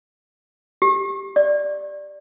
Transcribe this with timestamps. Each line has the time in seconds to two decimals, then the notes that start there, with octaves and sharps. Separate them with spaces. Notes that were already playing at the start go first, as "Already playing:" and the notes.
0.82 G4
1.36 D5